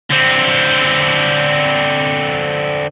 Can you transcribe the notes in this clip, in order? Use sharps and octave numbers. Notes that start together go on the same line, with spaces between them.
D3 C4